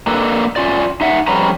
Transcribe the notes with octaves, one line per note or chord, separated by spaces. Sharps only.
A#3 D4 A4 B4
C#4 F4 D5
D#4 E5 F#5
F2 G3 C#4 B4 A#5